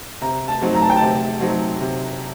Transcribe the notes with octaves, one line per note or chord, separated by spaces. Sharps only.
C3 A#5
A5
F#3 C4 D#4
A#5
A5
G5
C3 A5
F#3 C4 D#4
C3